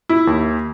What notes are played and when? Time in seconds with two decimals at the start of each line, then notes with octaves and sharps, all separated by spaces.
0.09 E4
0.27 D#2